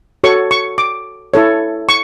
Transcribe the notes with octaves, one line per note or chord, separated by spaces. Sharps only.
F#4 A4 C#5 C#6
C#6
D6
E4 A4 C#5
C#6